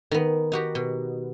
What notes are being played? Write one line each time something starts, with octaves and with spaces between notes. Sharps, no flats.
D#3 B3
D#4 F#4 G4
B2